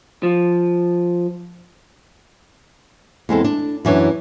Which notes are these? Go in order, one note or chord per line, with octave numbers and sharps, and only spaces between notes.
F3
E2 G#3 C4 A4
D4
F#2 E3 D4 C#5